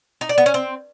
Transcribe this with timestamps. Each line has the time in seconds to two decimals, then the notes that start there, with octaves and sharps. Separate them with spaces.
0.21 D#4
0.29 D5
0.38 B3
0.46 C#4
0.54 C4